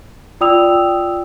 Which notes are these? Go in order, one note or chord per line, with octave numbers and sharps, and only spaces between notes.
F4 D5 G5 D#6 E6 F7